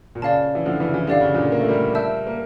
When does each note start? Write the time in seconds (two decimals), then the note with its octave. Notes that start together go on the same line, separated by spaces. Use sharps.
0.15 A#2
0.22 C#3 D5 F5 A5
0.55 E3
0.65 D3 F3
0.80 C#3 E3
0.94 E3
1.07 D3 G4 D5 F5
1.21 C#3
1.34 A#2 D3
1.52 A#3
1.60 A3
1.69 G3 A#3
1.95 E5 A5 E6 G6
2.27 A#3